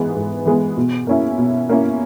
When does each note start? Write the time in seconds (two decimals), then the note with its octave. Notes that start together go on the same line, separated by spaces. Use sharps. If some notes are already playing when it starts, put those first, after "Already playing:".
Already playing: G#2 E3 G#3 B3
0.15 G#2
0.46 E3 G#3 B3
0.77 B2
1.07 A#3 C#4 E4
1.38 B2
1.69 A#3 C#4 E4